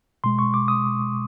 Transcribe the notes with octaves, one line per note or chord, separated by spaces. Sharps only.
B2 G#3 C6
C#6
D6
D#6